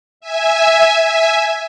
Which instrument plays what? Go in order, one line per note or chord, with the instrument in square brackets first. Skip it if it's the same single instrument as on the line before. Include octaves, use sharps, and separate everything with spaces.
[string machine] E5 G#5
E5 G#5